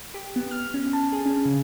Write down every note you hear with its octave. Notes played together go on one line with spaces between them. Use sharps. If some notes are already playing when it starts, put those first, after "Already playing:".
G4
B3
F6
C#4
A5
G#4
C#4
C#3